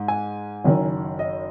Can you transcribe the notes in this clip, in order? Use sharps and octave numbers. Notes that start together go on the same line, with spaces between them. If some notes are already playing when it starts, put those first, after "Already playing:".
Already playing: G#2
G#5
F#1 F#2 D#3
D#5